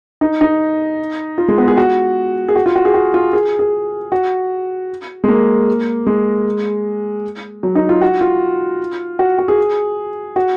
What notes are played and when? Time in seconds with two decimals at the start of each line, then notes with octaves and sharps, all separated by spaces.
0.21 D#4
0.41 D#4
1.38 F4
1.48 G#3
1.58 B3
1.68 G#4
1.77 F#4
2.48 G#4
2.56 F#4
2.66 F4
2.76 F#4
2.85 G#4
2.94 F#4
3.14 F4
3.33 G#4
3.59 G#4
4.12 F#4
5.24 G#3
5.28 A#3
6.07 G#3
7.63 F#3
7.75 D#4
7.89 F4
8.01 F#4
8.21 F4
9.19 F#4
9.39 F#4
9.48 G#4
10.36 F#4